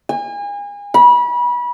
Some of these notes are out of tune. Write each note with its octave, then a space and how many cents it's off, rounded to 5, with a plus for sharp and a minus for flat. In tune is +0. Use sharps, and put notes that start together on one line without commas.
G#5 -35
B5 -30